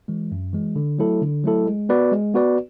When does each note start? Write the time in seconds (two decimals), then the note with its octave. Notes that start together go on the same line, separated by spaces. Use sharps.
0.08 E3 G#3
0.32 F#2
0.53 E3 G#3
0.76 D3
0.99 F#3 A3 E4 A4
1.22 D3
1.44 F#3 A3 E4 A4
1.66 G#3
1.89 B3 F#4 B4 D5
2.12 G#3
2.34 B3 F#4 B4 D5